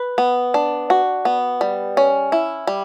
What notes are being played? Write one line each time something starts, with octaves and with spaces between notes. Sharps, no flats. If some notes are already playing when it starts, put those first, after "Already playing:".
Already playing: B4
B3
D4
F#4
B3
G3
C#4
E4
G3